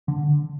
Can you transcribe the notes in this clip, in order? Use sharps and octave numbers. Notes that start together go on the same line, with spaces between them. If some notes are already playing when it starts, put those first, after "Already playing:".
D3